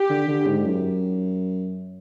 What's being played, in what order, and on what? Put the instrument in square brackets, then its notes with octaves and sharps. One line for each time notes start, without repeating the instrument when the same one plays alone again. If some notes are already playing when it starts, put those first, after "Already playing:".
Already playing: [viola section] G4
[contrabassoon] D3
D3
G#2
F#2